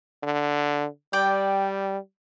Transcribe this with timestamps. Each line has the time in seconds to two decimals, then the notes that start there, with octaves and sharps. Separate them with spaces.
0.23 D3
1.13 G3 D5 G5